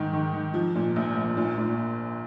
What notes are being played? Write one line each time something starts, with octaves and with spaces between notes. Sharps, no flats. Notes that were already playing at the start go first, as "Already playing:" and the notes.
Already playing: G#2 D#3
D#3
D#3
F3
A#2
A#1
A#1
A#2
A#2